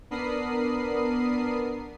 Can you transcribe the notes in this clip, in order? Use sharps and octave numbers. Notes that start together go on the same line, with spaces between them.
B3 D4 A#4 B5 D#6 C7